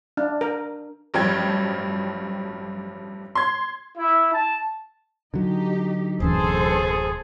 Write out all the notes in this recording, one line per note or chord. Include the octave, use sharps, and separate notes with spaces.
D4
A#4
A1 G2 F3 F#3 G5 G#6
C6 G#6
E4
A5
D3 F#3 D#4 G4
D1 F#2 B2 E3 G#4 A4 C5